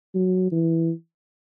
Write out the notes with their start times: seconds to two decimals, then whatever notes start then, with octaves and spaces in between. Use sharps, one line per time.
0.15 F#3
0.52 E3